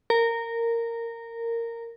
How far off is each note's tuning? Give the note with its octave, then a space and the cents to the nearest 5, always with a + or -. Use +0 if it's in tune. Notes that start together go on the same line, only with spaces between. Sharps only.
A#4 -15